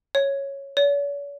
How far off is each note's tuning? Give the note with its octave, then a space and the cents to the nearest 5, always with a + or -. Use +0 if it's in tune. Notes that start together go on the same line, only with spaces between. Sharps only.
C#5 -5
C#5 +45